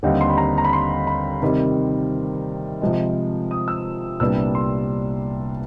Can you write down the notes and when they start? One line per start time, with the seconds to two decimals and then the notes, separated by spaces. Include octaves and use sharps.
0.03 D#2 D3 G3 C4 D#4 F#5
0.21 C6
0.30 B5
0.37 A#5
0.58 A#5
0.64 B5
0.73 C6
1.07 B5
1.42 C3 D#3 G3 C4
2.82 C3 F3 G#3
3.51 D#6
3.68 E6
4.20 C2 A#2 G3 B3 D4 E6
4.55 C6